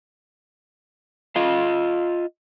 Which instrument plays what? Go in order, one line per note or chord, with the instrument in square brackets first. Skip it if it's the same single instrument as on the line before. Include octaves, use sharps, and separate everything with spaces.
[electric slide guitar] F4 D#5 F5